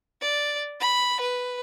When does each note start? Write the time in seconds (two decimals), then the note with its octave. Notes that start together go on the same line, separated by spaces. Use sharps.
0.21 D5
0.80 B5
1.21 B4